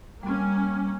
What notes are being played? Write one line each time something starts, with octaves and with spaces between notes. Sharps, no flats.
G3 A#3 C#4